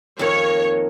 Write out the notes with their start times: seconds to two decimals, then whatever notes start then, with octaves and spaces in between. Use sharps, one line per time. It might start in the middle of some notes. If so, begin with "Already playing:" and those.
0.19 F2 D#3 A#3 C#5